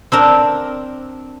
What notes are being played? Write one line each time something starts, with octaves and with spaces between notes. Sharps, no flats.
C4 D4 A#4